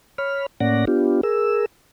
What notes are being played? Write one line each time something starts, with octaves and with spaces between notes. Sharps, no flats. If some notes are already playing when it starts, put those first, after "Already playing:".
C#5 B5 F6
A2 A#3 C#4 D5 F#5 A#6
B3 D4 F4 G4
G#4 A#4 E6